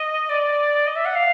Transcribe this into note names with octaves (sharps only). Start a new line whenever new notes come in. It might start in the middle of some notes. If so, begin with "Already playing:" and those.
Already playing: D#5
D5
D#5
E5
F#5
F5